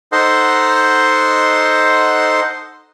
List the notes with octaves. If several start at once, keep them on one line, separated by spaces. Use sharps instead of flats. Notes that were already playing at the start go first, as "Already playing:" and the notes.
D#4 A4 C5 D#5 F#5 C6